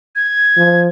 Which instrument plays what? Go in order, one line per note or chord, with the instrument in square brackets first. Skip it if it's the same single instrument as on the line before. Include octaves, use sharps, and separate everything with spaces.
[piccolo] G#6
[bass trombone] F3